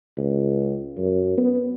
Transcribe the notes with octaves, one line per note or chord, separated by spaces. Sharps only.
C#2
F#2
B3